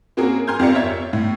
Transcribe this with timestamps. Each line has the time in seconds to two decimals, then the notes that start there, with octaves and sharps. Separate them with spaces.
0.17 A#3 C4 C#4 F#4 G#4 A#4
0.47 G#5 A#5 C6 F6 G6 G#6
0.59 F2 F4 G4 A#4 D5 C#7
0.75 C#5 E5 G#6
1.13 A2